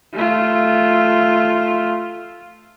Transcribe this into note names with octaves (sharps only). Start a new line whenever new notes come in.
A3 F4